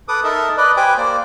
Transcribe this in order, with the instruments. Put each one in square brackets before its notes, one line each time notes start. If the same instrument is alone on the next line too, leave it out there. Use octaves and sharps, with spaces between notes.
[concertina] A4 B4 D6 D#6
D#4 A4 A#4 D#5 E5 A5
B4 D5 D#5
G4 B4 C5 G5 G#5 D6
A#3 C5 D5